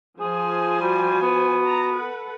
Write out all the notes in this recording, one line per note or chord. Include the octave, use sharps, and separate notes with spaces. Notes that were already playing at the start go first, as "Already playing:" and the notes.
F3 G#4 C5 G#5
G3 F#4
B3
A5 A#5
A4 B4 F#5